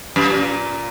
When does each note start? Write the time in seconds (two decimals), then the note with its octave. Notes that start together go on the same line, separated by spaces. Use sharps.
0.16 F#2
0.30 A#2